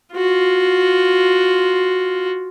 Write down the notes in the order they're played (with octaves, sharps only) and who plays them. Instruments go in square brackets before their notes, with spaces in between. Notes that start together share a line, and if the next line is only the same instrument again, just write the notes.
[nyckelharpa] F4 F#4